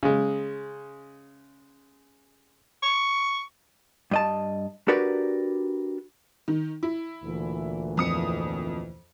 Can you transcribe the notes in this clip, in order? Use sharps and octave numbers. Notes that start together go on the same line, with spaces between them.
C#3 G#3
C#6
G2 D#5 A5
D4 F#4 G4 A#4 B4 D5
D#3
E4
D2 A#2 E3
F2 D#6 C#7